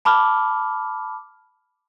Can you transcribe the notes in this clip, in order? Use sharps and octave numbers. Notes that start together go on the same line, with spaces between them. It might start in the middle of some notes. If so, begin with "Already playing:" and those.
A5 B5 D6 F6